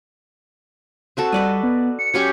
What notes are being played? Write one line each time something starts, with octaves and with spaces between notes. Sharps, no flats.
C4 F#4 A4
G3 B4 D5 D#5
B3
C#7
F#3 C#4 G4